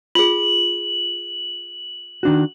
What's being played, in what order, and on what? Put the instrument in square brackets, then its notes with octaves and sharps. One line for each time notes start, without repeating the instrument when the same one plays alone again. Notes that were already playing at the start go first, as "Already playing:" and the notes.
[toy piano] F4 G#4 [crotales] F#7
[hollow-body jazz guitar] D#3 D4 F#4